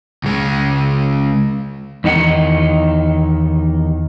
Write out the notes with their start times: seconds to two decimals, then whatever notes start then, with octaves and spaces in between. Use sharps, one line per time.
0.23 C#2 G#3
2.04 E2 D#3 D#4 F#5